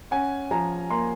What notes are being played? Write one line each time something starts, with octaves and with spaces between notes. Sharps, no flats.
C#4 F#5 G#5
F3 G#5 A#5
A#3 A#5 C6